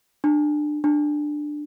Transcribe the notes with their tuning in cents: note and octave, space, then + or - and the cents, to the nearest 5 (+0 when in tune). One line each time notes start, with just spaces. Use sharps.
D4 +25
D4 +15